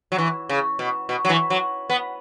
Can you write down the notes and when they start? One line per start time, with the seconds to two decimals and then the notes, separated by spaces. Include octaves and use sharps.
0.12 F#3
0.18 E3
0.49 C#3
0.79 B2
1.09 B2
1.25 F#3
1.29 E3
1.50 F#3
1.90 B3